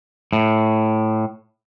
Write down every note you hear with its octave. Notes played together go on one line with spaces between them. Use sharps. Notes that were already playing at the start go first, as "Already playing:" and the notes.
A2